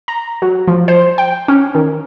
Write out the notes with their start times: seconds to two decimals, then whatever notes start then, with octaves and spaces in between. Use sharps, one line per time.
0.08 A#5
0.42 F#3
0.68 F3
0.88 C5
1.18 G5
1.48 C#4
1.75 D#3